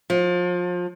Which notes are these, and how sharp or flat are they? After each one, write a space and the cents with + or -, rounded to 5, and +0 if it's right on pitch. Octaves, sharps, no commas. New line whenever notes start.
F3 +30